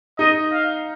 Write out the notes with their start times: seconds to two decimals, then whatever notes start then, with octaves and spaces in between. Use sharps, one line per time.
0.19 D#4 D#5
0.53 F5